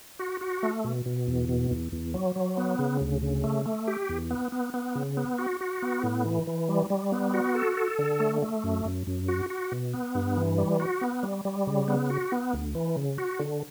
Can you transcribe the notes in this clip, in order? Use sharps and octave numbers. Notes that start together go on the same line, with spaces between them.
F#4
F#4
A3
B2
B2
E2
B2
E2
E2
F#3
F#3
B3
C#3
D2
C#3
A3
A3
G4
E2
B3
B3
B3
C#3
B3
F#4
F#4
B3
A2
E3
E3
G3
G3
B3
F#4
A4
A4
D3
A3
A3
F#2
F#2
F#2
F#4
F#4
B2
B3
G2
E3
G3
F#4
B3
G3
G3
C#3
B3
F#4
B3
D2
E3
C#3
F#4
D3